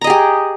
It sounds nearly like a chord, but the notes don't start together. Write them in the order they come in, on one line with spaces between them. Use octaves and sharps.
A#5 D#5 G#4 G4